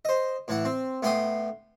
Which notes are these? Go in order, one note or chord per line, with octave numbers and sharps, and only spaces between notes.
C5 D#5
A2 E3 F#5
C4
A2 B3 G5 C6 D6 D#6